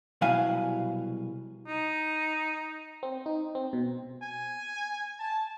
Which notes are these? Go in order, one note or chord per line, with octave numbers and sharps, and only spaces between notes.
C2 B2 F#3 E4 F5 G#5
D#4
C4
D#4
C4
B2
G#5
A5